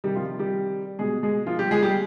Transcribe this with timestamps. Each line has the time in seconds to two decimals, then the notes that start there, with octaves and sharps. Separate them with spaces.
0.04 C3 D#3 G3 G4
0.16 F3 F4
0.39 G3 G4
0.99 B2 G#3 G#4
1.23 G#3 G#4
1.47 F3 F4
1.59 G3 G4
1.71 G#3 G#4
1.82 G3 G4